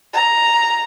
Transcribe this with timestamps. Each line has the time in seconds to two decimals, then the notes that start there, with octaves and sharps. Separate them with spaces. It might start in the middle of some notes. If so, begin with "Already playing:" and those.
0.14 A#5